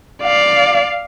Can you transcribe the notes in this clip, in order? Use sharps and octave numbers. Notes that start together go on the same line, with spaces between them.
D5 F5